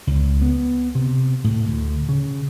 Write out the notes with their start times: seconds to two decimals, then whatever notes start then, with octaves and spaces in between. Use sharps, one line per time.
0.07 C#2
0.42 B3
0.95 C3
1.44 A2
1.66 D2
2.09 C#3